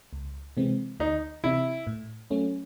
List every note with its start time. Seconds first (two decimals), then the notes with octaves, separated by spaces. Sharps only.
0.13 C#2
0.57 C3 E3 G#3 C4
1.00 D2 D#4
1.44 C3 E3 E4
1.87 A2
2.31 F#3 A3 C#4